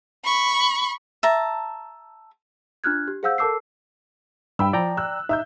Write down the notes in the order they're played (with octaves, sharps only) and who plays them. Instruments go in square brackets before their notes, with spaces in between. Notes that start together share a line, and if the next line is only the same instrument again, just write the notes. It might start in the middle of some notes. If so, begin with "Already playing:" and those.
[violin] B5 C#6
[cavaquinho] E5 A5 A#5
[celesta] D4 F4 F6 F#6 G#6
G4
G#4 C5 F5 F#5 E6 G6
A4 A#4 A5 D6 E6 C7
[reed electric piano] G2 [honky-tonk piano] G5 B5 E6
[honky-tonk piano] F3 [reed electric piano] D5 G5 A#5
[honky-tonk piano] E6 F#6
[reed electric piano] D#4 [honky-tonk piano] E5 E6 G6